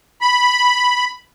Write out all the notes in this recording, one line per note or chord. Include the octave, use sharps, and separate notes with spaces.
B5